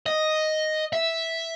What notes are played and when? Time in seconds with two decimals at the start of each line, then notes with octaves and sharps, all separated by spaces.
0.06 D#5
0.93 E5